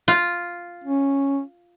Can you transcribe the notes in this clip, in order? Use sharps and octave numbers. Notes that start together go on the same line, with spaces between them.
F4
C#4